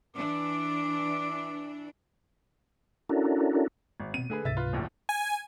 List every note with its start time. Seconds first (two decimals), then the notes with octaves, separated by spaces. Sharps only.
0.16 E3 D4 D6
3.09 C#4 D4 E4 F#4 A4 A#4
4.00 G#1
4.14 B2 B3 C4 D#7
4.30 D3 A3 D4 G#4 B4
4.45 C#2 G#2 C3 E5 A6
4.57 F4 B4
4.73 D1 A#1 D#2
5.09 G#5